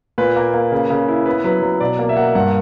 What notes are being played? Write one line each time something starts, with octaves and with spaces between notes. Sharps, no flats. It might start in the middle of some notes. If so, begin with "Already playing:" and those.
A#2 B4
A#3
A#3
C#3
C#3
E4
B3 B4
F#3 B4
F#3
B2 D5
A#3
E5
A#3 F#5
G2 F#5